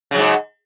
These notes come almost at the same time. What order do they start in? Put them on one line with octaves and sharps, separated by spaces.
C#3 F#3 G#2